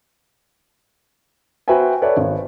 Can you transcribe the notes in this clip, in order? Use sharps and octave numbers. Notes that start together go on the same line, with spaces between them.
F#4 B4 C5 E5 G5 G#5
A4 B4 C#5 D5 E5
G#1